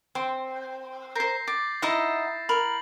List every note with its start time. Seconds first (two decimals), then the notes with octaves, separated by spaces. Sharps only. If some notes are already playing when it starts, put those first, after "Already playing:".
0.15 C4 C6
1.15 A#4 C5 G6 A#6 C7
1.48 D6 A6
1.82 D#4 E4 D#5 F#5
2.49 A#4 B5 F#7